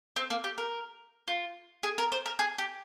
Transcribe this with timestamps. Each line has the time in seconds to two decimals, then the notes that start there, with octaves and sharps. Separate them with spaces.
0.16 C4
0.30 A#3
0.44 G4
0.58 A#4
1.28 F4
1.83 G#4
1.98 A#4
2.12 C5
2.26 A#4
2.39 G#4
2.58 G4